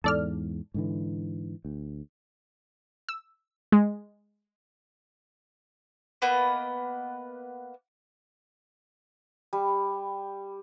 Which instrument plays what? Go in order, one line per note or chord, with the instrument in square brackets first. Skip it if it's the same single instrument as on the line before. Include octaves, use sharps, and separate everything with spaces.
[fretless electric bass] E2 G#2 [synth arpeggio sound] A4 D5 F6
[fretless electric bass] G#2 D3 E3
D2
[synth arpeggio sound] E6
G#3
[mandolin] A#3 B3 B4 D#5
[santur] G3